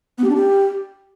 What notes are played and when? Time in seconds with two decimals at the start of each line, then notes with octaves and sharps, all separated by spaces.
0.18 B3
0.24 G4
0.30 D4
0.36 G4